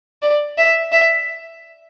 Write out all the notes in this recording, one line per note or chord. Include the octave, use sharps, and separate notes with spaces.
D5
E5
E5